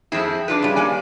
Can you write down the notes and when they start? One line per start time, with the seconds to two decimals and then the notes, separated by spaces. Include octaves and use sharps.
0.12 F2 C4 E4 G#4
0.48 D4 F4 B4
0.62 C#3 G3
0.76 A#3 D5 G#5